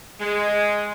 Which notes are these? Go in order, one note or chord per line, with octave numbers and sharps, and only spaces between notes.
G#3